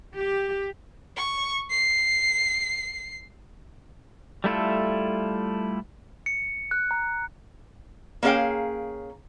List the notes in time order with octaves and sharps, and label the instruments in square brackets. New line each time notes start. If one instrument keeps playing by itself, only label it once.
[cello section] G4
[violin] C#6
C7
[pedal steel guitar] G3 A3 E4 F4 A4
[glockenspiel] C#7
F#6
A#5
[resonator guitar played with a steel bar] A#3 C#4 G#4 F5 G5